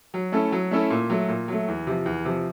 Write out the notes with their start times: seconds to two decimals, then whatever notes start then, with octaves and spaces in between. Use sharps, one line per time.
0.14 F#3
0.32 A3 C#4 E4 A4
0.52 F#3
0.71 A3 C#4 E4 A4
0.90 A#2
1.10 F#3 A3
1.29 A#2
1.48 F#3 A3
1.68 E2
1.87 C3 F3
2.06 E2
2.25 C3 F3